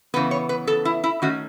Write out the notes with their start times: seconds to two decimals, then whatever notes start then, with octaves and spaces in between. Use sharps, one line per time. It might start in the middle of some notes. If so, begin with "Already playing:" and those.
0.14 C#3 E3 B3 B4
0.31 C#5
0.49 B4
0.67 A4
0.85 E4
1.04 E4
1.22 D#3 A3 C#4 F#4